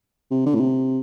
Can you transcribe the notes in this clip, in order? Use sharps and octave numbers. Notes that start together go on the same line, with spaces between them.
C3
D3
A2
C3